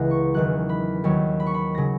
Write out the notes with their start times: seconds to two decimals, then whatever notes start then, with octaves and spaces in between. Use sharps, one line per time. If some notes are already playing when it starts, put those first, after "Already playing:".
Already playing: C#2 C#3 E3 F#5 A#5
0.11 C#6
0.34 E2 D#3 F#3 F#6
0.69 B5
1.04 D#2 D#3 F#3 C#5
1.40 B5
1.47 C#6
1.54 B5
1.75 C#3 F#3 A#6